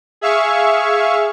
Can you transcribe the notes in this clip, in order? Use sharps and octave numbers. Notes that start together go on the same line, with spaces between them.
G#4 E5 F5 C#6